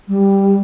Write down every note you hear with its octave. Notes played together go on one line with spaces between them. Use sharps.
G3